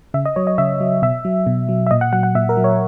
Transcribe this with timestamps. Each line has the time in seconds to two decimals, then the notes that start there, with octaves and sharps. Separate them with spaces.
0.14 C#3 E5
0.26 D#5
0.36 F#3 C#5
0.47 D#5
0.58 C#3 E5
0.80 F#3
1.02 B2 E5
1.25 F#3
1.47 B2
1.69 F#3
1.87 E5
1.91 A#2 D#5
2.01 F#5
2.13 F#3 F#5
2.23 F#5
2.35 A#2 E5
2.49 A#4
2.57 F#3
2.64 C#5